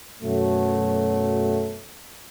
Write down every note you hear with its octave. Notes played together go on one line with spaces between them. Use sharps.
F#2 B2 F#3 A3